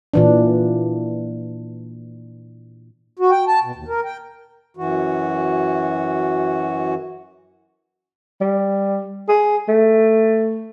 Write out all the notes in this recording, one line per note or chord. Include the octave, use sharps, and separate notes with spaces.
A#2 E3 D4
F#4
G5
A5
B2
D#2
A#4
G5
F#2 E3 F#4
G3
G#4
A3